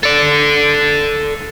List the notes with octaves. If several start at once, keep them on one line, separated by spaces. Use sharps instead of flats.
A4 D5